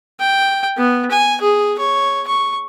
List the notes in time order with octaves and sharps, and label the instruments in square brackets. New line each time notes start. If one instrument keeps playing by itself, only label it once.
[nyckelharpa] G5
B3
G#5
G#4
C#5
C#6